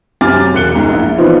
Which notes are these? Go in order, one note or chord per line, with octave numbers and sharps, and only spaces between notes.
F#2 C3 C#4 D6 F6 A6
E1 F#6 C#7 G7
C#2 G#2
A#1 E4
E3 F3 B3 C4 D#4 F4